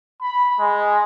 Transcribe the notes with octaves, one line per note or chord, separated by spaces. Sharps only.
B5
G#3